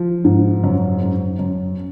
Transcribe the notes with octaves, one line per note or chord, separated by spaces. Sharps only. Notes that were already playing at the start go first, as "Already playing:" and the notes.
Already playing: F3
G#2
F#2
F#2
F#2